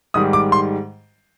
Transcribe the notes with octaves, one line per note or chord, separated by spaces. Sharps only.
G#2 D#3 G3 D#6
D6
C6